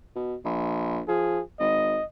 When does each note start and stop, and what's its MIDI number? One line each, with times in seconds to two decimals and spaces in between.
0.16 0.35 47
0.45 1.01 34
1.08 1.41 53
1.08 1.42 68
1.60 1.99 32
1.60 2.04 75